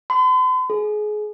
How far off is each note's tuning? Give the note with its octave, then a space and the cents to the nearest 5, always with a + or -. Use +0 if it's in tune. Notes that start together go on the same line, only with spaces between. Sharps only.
C6 -45
G#4 +25